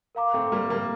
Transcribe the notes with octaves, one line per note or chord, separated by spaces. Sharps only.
A#4 F5 A#5 D6
A3 C4
G3 A#3
G3 A#3